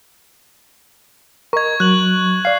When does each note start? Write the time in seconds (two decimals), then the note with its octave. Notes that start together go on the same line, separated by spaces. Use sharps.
1.53 A#4 D#5 C#6 G#6
1.80 F#3 F#6 F#7
2.45 D5 F5 C7